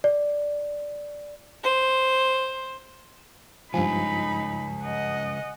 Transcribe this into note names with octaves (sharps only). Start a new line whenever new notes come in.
D5
C5
G2 C#3 F3 G#3 D#4 G#5 B5
D#5 F#5